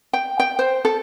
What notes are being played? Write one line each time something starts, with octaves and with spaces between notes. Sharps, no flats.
G5
G5
C5
A4